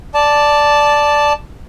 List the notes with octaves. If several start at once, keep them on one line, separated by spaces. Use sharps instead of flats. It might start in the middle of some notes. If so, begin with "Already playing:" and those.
D5 A5